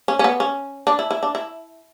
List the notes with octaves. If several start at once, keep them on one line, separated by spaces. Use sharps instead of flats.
C#4
C#4
B3
C#4
D4
E4
E4
D4
E4